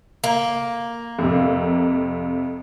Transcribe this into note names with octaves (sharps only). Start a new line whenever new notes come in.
A#3
F2 C3